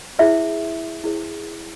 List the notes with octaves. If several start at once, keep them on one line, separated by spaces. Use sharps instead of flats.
E4 G#4 C5 E5
E4 G#4 C5